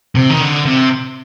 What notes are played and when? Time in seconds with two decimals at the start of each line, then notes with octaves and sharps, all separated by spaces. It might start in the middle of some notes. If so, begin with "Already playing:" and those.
0.15 C3
0.30 D#3
0.41 D3
0.66 C3